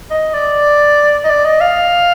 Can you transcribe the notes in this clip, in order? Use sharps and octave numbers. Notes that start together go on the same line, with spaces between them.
D#5
D5
D#5
D5
D#5
F5